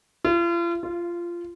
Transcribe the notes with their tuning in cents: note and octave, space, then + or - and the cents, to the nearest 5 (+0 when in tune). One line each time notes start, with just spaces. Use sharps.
F4 -40
F4 -15